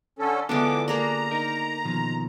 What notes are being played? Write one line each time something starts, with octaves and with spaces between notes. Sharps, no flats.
D3 C#4 A4
D3 E3 G#3 B3 D4 F4 A4 D6
A#3 G#4 D5 A#5
D#4 A#4
B2 D#3 F3